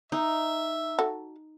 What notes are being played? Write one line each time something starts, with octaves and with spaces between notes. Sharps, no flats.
D#4 E5
F#4 A4